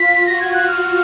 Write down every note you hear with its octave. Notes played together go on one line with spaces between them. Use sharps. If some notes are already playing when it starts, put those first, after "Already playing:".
Already playing: F4 B6
F#4 A#6
G#6
F#6
F6